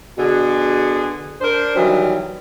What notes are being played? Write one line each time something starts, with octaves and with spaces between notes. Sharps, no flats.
B2 D3 G#4
D4 A#4 C5
D#3 E3 F#3 G3